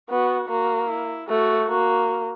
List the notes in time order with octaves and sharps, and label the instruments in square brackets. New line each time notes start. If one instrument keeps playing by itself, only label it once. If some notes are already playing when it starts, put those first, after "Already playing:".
[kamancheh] B3 [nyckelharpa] F#4
[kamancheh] A#3 [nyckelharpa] F#4
[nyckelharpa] E4
[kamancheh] A3 [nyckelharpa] F#4
[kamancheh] A#3 [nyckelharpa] F#4